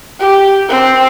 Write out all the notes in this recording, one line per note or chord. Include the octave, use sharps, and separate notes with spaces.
G4
C4